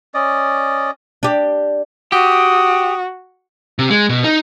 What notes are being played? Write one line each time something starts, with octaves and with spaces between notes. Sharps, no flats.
C#4 D5 D#5
D4 G4
F#4 G4 D#6
C3
G#3
B2
D#4